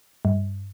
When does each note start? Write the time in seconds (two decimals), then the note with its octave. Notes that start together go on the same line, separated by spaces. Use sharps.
0.25 G2